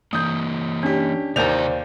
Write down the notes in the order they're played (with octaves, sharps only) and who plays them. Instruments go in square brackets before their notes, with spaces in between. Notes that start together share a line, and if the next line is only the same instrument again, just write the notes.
[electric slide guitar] E3 A#3 [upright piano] D#6 G6
[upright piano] C#4 G4 [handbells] D4
[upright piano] D#2 G6 F7 [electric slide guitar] C3 A#4 [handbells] C5 D5